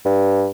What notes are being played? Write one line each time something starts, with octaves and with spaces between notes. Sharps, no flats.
G2